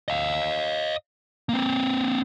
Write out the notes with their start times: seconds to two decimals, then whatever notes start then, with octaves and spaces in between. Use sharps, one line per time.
0.08 D#5 F5
1.49 A#3 C4